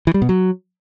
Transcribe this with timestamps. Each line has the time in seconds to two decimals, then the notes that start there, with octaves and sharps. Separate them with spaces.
0.07 E3
0.14 G3
0.22 B2
0.29 F#3